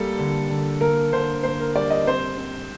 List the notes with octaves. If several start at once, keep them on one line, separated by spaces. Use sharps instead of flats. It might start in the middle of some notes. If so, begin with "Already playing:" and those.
Already playing: G3 A#3 A4
D3
D3
A#3 A#4
D3 C5
A#3 C5
A#4
G3 D5
D#5
C4 C5
C4